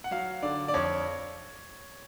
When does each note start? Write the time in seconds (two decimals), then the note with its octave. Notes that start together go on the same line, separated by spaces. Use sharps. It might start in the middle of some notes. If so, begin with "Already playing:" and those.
0.04 F#5
0.11 F#3 F5
0.42 D3 D5
0.68 D5
0.74 F2 C#5